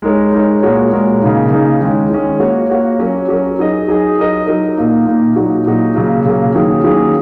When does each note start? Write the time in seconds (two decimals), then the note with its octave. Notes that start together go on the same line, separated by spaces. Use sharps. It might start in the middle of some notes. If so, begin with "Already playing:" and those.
0.02 G#3 D#4 A#4 C#5
0.32 G#3 D#4 A#4 C#5
0.63 A#2 G#3 F#4 A#4 C#5
0.92 A#2 G#3 F#4 A#4 C#5
1.22 C#3 A#3 D#4
1.51 C#3 A#3 D#4
1.80 D#3 G#3 C#4
2.10 D#3 G#3 C#4
2.39 A#3 F#4 C#5
2.70 A#3 F#4 C#5
2.99 F#3 C#4 A#4
3.28 F#3 C#4 A#4
3.59 F#3 D#4 G#4 D#5
3.88 F#3 D#4 G#4 D#5
4.18 F#3 D#4 A#4 D#5
4.47 F#3 D#4 A#4 D#5
4.77 A#2 A#3 D#4
5.06 A#2 A#3 D#4
5.36 A#2 F#3 D#4 F#4
5.66 A#2 F#3 D#4 F#4
5.95 C#3 F#3 A#3
6.26 C#3 F#3 A#3
6.55 D#3 F#3 A#3 C#4 G#4
6.84 D#3 F#3 A#3 C#4 G#4